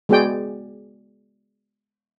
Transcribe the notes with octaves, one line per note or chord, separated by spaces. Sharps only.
G#3 B3 F#4 G#4 D5 G5